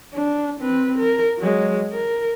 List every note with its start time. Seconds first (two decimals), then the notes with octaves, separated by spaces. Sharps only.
0.14 D4
0.60 C4 B4
0.98 A#4
1.39 F#3 G#3
1.92 A#4